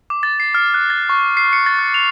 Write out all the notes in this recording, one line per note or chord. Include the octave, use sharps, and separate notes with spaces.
D6
A6
C7
F6
F#6
A6
C#6
C7
C#7
A6
F#6
F7